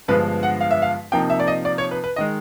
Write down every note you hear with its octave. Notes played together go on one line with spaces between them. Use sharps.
G2 D3 F3 G#3 B3 B4
F#5
F5
E5
F5
C3 F3 A#3 D#4 G5
E5
D5
D#5
D5
C#5
B4
B4
D#3 G#3 D#5